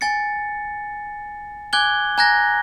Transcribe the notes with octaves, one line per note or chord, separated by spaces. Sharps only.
G#5 A6 C#7
G#5 D6 F#6 G#6 G7
G#5 A#5 F#6 G#6 A#6